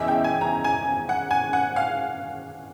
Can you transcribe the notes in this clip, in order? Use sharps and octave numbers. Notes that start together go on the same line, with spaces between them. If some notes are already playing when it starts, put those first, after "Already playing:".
Already playing: E2 C#3 E3 D#5 E5
G5
G#5
A#5
G#5
F#5
G#5
F#5
F5